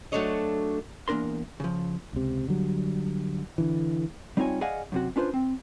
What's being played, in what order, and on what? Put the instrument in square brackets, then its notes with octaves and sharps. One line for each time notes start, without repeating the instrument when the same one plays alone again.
[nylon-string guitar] F#3 A3 D4 A4 C#5 D#5
[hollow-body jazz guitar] E2 A#3 D4 A#4 C6
C#3 F3
[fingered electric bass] C#2 C3
D3 F#3 G3
D3 E3
[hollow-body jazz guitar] G3 C4 D#4 F4 C#5 G#5
G#4 D5 D#5 F5 F#5 G#5
F#2 C3 F#4
C#4 D4 F4 B4 C5
C4